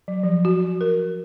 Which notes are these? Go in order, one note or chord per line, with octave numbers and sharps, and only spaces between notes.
F#3
F3
F#4
A#4